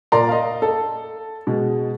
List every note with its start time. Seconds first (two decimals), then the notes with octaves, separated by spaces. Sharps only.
0.12 A#2 A#4 D5 A#5 C6
0.29 D#5 F5
0.62 A4
1.47 B2 G#3